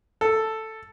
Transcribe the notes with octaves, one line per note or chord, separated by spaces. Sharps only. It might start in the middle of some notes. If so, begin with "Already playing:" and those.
A4